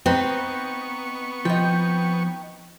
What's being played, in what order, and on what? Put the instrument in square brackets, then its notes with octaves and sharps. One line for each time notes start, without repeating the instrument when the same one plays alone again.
[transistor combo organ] B3 C#6 [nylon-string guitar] C4 [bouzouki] D#4 B4
[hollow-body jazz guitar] F3 [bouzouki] D#4 G5